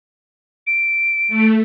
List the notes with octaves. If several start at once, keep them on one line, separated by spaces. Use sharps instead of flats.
D7
A3